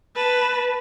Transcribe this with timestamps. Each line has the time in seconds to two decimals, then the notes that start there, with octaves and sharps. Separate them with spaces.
0.16 B4 A5